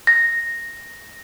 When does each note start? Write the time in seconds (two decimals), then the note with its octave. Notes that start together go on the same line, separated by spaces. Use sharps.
0.07 A#6